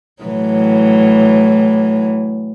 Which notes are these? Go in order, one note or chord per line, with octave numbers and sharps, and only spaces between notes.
A2 E3 F#3